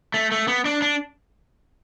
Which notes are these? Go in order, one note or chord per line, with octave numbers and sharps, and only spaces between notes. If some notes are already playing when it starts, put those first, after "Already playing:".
A3
A3
B3
D4
D4